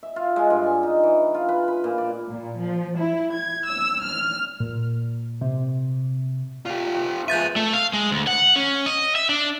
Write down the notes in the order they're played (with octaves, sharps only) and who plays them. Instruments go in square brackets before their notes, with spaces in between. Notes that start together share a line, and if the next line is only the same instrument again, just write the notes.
[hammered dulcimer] E5
F4
G#3
G2
G#5
D#4
E3
F4
B4
B5
A#2
D5
[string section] A#2
F3
E4
G#6
E6
F6
[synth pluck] A#2
C3
[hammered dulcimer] A#2 [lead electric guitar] F4 G4
[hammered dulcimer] A#2 F3 C4
[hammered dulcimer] G#3 B4 [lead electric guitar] G#4 E5 [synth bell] G6 A6 D#7
[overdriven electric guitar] A3
F5
G#3
D2
F#5
C#4
D#5
E5
D4